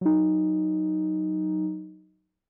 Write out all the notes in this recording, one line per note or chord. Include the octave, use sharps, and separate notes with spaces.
F#3 D#4